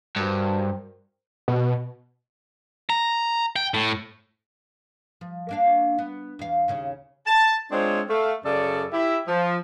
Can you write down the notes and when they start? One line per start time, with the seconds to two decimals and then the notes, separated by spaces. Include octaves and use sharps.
0.16 G2 F#4 A#4 C5
1.48 B2
2.90 A#5
3.56 G5
3.74 A2
5.21 F3
5.49 A#3 D4 F5
5.98 B3
6.39 E2 F5
6.68 D#2 C#3 C#4
7.26 A5
7.71 G#3 C4 D4 F4 C5 C#5
8.09 A3 F5
8.44 F#2 C#3 A4 D5
8.92 E4 G4 E5
9.27 F3